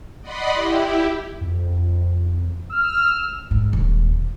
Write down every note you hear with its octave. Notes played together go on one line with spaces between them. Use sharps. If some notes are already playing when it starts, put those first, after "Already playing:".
D5 D#5 F#5 B5 C6
E4 G4
F2
E6 F6
G#2
D#1 D#2